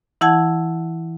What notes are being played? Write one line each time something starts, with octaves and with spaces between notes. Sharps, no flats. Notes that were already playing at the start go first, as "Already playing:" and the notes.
E3 E4 F#5 A5 G#6